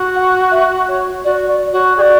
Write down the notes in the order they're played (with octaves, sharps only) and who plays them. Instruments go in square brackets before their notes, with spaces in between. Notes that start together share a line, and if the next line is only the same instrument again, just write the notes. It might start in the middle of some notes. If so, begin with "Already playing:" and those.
Already playing: [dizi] F#4
[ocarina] F#5
E5
C#5
[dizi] F#4 [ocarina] D5
[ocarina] D5
[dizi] F#4 [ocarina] C#5
[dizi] F#4 G#4 [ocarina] D5